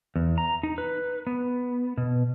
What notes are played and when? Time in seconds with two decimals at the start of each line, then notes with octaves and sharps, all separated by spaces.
0.16 E2
0.38 A#5
0.63 D#4
0.78 B4
1.27 B3
1.98 B2